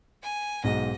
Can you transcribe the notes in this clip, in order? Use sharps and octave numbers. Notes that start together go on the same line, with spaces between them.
G#5
B1 G#2 D#5